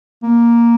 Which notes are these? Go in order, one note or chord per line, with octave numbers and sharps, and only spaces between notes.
A#3